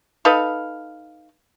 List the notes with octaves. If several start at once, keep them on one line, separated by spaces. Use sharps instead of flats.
D#4 A4 B4 F5